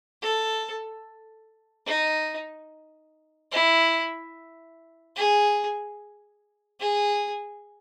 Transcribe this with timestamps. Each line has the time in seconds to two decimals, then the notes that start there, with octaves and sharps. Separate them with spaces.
0.22 A4
1.87 D#4
3.52 E4
5.16 G#4
6.80 G#4